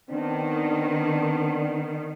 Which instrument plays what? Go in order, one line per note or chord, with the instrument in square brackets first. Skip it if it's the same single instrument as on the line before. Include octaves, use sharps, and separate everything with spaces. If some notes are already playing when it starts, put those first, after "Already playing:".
[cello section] D#3 [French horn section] B3 C4 D4